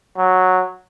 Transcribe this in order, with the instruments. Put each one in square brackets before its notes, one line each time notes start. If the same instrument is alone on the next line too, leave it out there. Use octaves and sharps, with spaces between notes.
[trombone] F#3